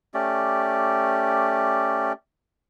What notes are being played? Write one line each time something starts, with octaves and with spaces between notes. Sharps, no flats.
A3 C#4 G4 D5